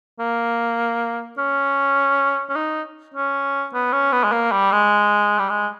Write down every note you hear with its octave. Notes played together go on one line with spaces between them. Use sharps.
A#3
C#4
C#4
D#4
C#4
B3
C#4
B3
G#3
A#3
G3
G#3
G3
G#3